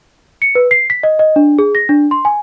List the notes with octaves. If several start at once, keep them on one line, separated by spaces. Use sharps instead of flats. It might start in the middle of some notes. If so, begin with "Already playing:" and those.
C#7
B4
C7
B6
D#5
D#5
D4
G#4
A#6
D4
C6
G#5